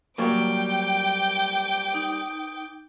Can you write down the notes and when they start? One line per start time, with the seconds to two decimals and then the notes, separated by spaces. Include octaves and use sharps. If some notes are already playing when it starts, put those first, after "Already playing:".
0.18 F#3 G3 A#3 G5 D6
1.94 D#4